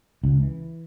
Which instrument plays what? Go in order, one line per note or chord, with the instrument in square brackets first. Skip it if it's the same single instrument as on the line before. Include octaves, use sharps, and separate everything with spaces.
[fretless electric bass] C#2
E3